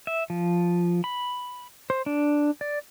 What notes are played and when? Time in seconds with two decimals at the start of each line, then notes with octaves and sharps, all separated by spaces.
0.07 E5
0.30 F3
1.04 B5
1.90 C5
2.06 D4
2.61 D5